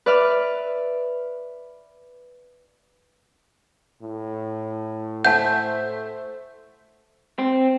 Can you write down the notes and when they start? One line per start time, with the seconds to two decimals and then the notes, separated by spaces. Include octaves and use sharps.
0.06 B4 D5 E5 F6
4.02 A2
5.25 A3 C5 E5 F#5 A5 G6
7.39 C4